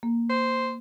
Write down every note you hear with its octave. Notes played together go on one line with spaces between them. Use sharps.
A#3
C5